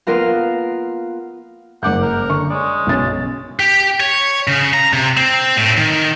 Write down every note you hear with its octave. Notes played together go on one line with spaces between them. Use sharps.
A#3 B3 F4 A#4 F5
F#1 G2 F#5 D6 G6
A#4
D3 C#6
G#3 C#5 D5
B1 B3 C#4 A6
G4
C#5
C#3
A#5
C3
C4
A2
D#3